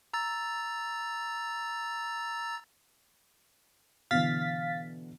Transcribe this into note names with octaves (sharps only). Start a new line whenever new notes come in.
A#5 E6 A6
B2 D3 E3 F5 A6 B6